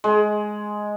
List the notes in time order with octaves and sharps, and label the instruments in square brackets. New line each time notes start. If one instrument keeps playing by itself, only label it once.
[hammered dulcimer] G#3